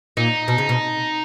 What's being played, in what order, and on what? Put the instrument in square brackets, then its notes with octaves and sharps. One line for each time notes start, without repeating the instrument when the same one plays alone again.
[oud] A#2 [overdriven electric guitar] D#4
[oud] B2
C#3
B2